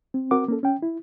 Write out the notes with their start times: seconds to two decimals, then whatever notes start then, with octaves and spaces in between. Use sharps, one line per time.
0.14 C4
0.31 C4 F#4 A#4 F#5 D6
0.48 A#3 C#4 A4
0.63 C#4 G5
0.82 E4